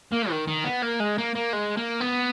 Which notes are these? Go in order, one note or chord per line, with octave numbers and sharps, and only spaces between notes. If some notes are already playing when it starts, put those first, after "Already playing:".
A#3
D#3
D#3
B3
A#3
G#3
A#3
A#3
G#3
A#3
B3